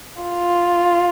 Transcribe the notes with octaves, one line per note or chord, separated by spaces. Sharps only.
F4